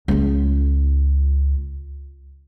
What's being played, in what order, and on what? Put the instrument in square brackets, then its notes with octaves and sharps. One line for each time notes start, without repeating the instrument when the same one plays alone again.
[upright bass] C#2 F4